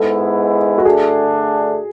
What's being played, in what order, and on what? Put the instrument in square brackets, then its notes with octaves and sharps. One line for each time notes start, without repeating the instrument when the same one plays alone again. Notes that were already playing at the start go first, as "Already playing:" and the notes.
Already playing: [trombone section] G#2 G#3 B3 E4 [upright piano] A4
[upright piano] F#4
[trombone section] D3 A3 D4 [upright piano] G#4